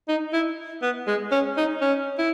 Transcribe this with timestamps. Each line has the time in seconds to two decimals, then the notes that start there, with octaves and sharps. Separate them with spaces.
0.08 D#4
0.33 E4
0.82 B3
1.07 G#3
1.32 C#4
1.57 D#4
1.81 C#4
2.19 E4